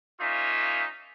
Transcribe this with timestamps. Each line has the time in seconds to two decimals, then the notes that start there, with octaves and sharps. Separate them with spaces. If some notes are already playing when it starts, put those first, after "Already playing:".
0.20 A#3 C#4 D#4 F4 E5